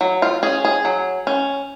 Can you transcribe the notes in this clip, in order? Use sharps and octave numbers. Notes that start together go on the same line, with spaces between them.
F#3
F4
C#4 G#4
G#4
F#3
C#4